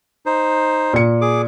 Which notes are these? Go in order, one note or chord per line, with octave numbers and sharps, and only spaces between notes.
D#4 C5
A#2 C#7
G#4 D6